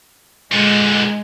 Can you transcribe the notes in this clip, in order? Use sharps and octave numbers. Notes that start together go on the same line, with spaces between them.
A#2 D3 G#3